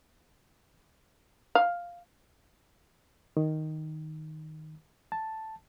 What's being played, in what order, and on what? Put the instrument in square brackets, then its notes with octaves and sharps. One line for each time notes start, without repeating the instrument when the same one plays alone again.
[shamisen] F5
[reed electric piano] D#3
A5